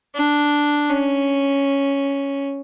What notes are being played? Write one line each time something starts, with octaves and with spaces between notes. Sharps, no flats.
D4
C#4